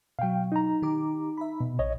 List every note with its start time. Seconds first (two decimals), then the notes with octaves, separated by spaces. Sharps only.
0.19 B2 F#3 F5 G5
0.52 D#4 A#5
0.82 D#3 G4 D6
1.37 E5 B5
1.60 B2
1.79 A#1 C#5 D#5